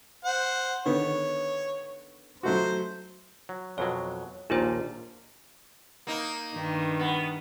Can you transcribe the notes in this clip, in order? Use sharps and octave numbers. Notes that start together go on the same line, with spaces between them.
C5 F#5
D3 D#3 B3 C#5
F#3 A3 F#4 C5
F#3
F2 B2 F#3 C#5
A#1 D#2 A#2 D#4 F4 C5
A#3 D#4
G2 D#3
B3